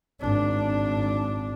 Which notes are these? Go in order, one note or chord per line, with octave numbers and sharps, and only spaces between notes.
G#1 D4